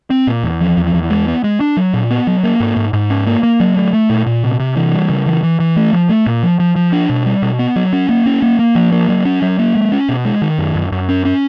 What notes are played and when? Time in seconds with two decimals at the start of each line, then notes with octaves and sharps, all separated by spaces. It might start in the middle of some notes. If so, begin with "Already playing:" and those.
0.10 C4
0.27 A#2
0.44 E2
0.61 F3
0.77 E2
0.94 E2
1.11 G#3
1.27 B3
1.44 G#3
1.60 D4
1.77 F#3
1.94 A#2
2.11 B3
2.27 F#3
2.44 A#3
2.60 G#2
2.77 G#2
2.93 G#2
3.10 C#4
3.26 A#3
3.43 A#3
3.60 F#3
3.77 A3
3.93 A3
4.10 A#2
4.27 A#2
4.44 C3
4.60 C3
4.76 E3
4.93 G3
5.09 C#3
5.26 E3
5.43 E3
5.60 E3
5.76 A3
5.93 F3
6.09 A3
6.26 A#2
6.43 F3
6.59 F3
6.76 F3
6.92 D4
7.10 B2
7.26 G3
7.42 B2
7.59 B3
7.76 F#3
7.93 C#4
8.09 A#3
8.26 C#4
8.42 A#3
8.59 A#3
8.75 F3
8.92 A#3
9.09 F#3
9.25 C#4
9.42 F#3
9.59 A#3
9.75 G#3
9.92 C#4
10.09 B2
10.25 G#3
10.42 D#3
10.59 F#2
10.75 F#2
10.92 F#2
11.09 C#4
11.25 C#4